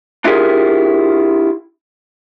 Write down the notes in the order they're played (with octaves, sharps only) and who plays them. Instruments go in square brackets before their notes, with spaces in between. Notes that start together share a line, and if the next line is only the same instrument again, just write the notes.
[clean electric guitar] D4 E4 F4 G4 G#4 A#4